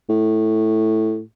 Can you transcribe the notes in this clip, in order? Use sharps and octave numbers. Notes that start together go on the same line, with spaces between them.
A2